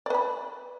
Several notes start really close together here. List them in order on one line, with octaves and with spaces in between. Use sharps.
D5 B4 B5